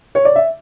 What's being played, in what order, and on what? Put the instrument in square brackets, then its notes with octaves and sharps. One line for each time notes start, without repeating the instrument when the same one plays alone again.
[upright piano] C#5
D5
E5